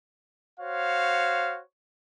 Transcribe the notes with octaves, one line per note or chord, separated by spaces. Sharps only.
F#4 C5 C#5 F5